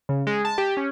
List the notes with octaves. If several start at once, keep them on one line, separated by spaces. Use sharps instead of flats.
C#3
G#3
A5
G4
C#4